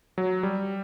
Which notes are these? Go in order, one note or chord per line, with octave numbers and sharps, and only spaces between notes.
F#3
G3